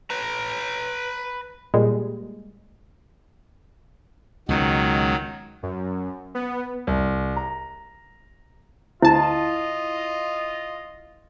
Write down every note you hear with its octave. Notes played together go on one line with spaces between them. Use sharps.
B4 A#5
A#2 G3 G#3 A#3
C#2 B2 D#3 F#3
F#2
B3
C2
A#5
D2 E4 F4 D#5 A5